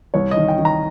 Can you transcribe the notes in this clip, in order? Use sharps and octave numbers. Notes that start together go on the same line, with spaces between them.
C2 C#5
D#5
D#3
G5
D#3
A#5